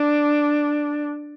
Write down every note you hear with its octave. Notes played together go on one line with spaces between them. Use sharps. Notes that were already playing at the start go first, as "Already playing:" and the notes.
Already playing: D4